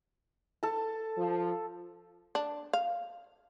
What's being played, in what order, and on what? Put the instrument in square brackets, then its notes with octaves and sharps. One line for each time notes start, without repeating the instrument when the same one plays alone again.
[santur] A4 A5
[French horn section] F3
[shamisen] D4
F5